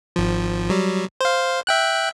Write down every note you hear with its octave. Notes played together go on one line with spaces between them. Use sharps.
G#1 F3
F#3 G3
C5 F5
E5 G5 F#6